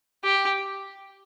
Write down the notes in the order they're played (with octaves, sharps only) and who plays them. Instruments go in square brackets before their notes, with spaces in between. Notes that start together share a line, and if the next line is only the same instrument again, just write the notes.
[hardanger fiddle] G4